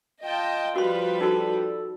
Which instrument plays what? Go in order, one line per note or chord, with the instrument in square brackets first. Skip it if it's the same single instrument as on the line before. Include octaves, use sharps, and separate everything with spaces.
[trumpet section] F4 [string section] D#5 G5 A5
[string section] F3 G3 B4 [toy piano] F#4 C6
[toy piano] D#4 F#4 [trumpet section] A4